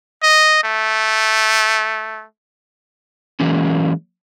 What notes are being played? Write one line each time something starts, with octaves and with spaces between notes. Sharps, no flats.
D#5
A3
E3 F#3 G#3 A#3 C#4